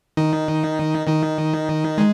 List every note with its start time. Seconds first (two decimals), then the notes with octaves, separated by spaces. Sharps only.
0.17 D#3 D#4
1.07 D#3 D#4
1.98 G#3